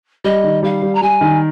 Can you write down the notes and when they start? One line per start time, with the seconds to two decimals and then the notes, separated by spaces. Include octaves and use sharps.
0.24 G3 D#5
0.44 D#3
0.63 G3 F5
0.82 G3
0.94 A#5
1.02 G3 G#5
1.21 D#3